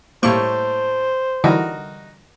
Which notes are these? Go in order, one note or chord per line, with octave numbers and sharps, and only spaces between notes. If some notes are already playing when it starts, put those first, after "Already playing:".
A2 G3 A#3 C5 C#6
D3 E3 G3 D#4 E4 F#4 A#4